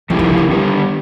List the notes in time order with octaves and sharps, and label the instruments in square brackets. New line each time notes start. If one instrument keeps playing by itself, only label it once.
[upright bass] E3 [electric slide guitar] F3 A3 C4 E4 G4
[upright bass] D#3
D3
D#3
[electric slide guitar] G2 D3 G3 B3 D4